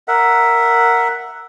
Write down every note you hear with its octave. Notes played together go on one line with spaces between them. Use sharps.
A#4 E5 F#5